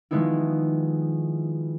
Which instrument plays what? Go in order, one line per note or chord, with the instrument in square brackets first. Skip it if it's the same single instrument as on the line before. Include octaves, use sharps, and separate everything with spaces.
[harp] D#3 F3 G#3 B3 D#4 E4